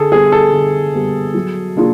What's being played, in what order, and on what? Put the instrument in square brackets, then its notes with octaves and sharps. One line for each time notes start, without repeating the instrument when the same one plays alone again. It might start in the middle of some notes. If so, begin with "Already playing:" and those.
Already playing: [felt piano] D3 [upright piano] G#4 A4
[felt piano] G3 B3 [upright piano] G#4
[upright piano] A4
[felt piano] D3
G3 B3
F#3
A#3 D4 F4 G#4